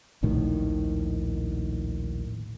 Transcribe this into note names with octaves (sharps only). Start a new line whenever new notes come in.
A#1 D#2 A2 D#3